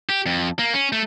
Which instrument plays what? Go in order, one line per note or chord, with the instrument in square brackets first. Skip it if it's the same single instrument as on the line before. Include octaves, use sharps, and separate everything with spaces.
[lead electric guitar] G4
F2
A#3
C#4
A3